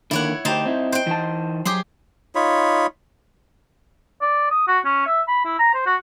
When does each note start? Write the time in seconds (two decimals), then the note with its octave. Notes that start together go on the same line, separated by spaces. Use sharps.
0.11 D3 D#3 A#3 E4 C#5 F#5
0.45 D2 D#4 G4 C5 A5
0.66 C4 E4
0.92 C5 G5
1.07 E3 D#4 A5
1.65 F#3 G4 G#4 C6
2.35 D#4 F4 C#5 B5
4.21 D5
4.51 D#6
4.68 F#4
4.85 C#4
5.07 E5
5.28 B5
5.45 E4
5.59 A#5
5.74 C5
5.86 F#4